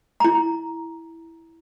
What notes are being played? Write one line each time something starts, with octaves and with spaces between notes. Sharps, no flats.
E4 A#5